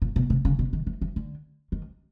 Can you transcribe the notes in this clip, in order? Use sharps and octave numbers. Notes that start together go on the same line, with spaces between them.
A#2
B2
C3
C#3
B2
D#3
E3
E3
D3
D#3